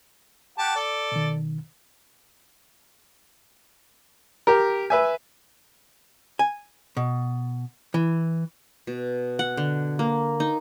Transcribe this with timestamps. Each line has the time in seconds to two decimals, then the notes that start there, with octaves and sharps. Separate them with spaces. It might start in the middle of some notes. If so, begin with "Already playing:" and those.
0.58 G4 F#5 A5
0.76 A4 D5
1.12 B2 D#3
4.47 G4 A#4
4.90 B4 E5 G#5
6.39 G#5
6.97 B2
7.94 E3
8.87 B2
9.39 F#5
9.57 D3
9.99 A#3
10.40 D#4